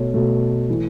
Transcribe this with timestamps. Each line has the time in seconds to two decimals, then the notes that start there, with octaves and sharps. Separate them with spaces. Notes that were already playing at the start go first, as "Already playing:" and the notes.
Already playing: B2 A3 C#5
0.14 B2 A3
0.70 E3 A3